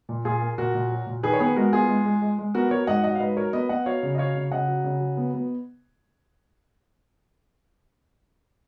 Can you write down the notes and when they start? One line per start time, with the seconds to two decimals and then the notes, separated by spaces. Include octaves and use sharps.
0.09 A#2
0.25 A#2 F4 G#4
0.41 A#3
0.58 A#2 F#4 A#4
0.75 A#2
0.91 F#3
1.07 A#2
1.23 D#3 G#4 B4
1.33 C#5
1.40 B3 G#4 B4
1.56 G#3 F#4 A#4
1.73 B3 F4 G#4
1.89 G#3
2.05 G#3
2.22 G#3
2.39 G#3
2.54 B3 F#4 A#4
2.71 F#3 A#4 C#5
2.87 G#2 D#5 F#5
3.04 F#3 D#5 F#5
3.15 F5
3.20 G#2 B4 D#5
3.37 F#3 A#4 C#5
3.53 B3 B4 D#5
3.69 B3 D#5 F#5
3.86 F#3 C#5 F5
4.03 C#3
4.15 D#5
4.18 F#3 C#5 F5
4.35 C#3
4.51 C#3 D#5 F#5
4.68 F#3
4.84 C#3
5.00 F#3
5.17 B3
5.34 B3